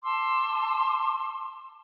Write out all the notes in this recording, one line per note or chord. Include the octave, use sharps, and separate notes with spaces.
A5 C6 D6 E6